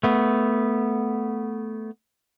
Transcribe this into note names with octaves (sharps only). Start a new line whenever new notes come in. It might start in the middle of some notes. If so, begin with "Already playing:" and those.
A3 B3